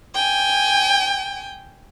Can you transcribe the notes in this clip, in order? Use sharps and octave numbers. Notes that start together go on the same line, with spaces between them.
G5 G#5